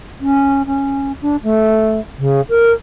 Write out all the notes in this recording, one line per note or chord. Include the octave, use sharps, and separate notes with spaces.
C#4
C#4
D4
A3
C#3
A#4